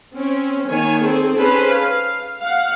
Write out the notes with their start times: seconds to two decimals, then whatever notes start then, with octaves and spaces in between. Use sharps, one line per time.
0.14 C4 C#4
0.68 D#3 A#3 C#5 G#5
1.03 C4 G#4 A4
1.37 C#4 G#4 A4 B4 C5
1.72 F5
2.41 F5 F#5